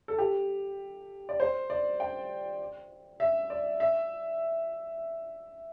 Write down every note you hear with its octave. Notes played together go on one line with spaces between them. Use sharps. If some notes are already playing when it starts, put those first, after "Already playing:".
A4
G4
D5
C5
D5
G5
E5
D5
E5